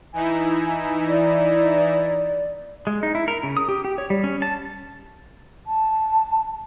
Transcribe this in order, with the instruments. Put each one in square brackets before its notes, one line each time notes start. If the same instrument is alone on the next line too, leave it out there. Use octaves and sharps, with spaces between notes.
[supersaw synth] E3 D#4 E4 [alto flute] G#5
[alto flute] D5
[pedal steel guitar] G#3
D#4
E4
A#4
C#3
D#6
G4
G4
C#5
G3
C#4
A5
[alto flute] A5